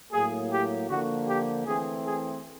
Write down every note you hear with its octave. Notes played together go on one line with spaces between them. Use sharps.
A2 F#3 A#3 G#4
G4
D3 F3 A#3 F#4
G4
E3 A3 C4 G#4
G#4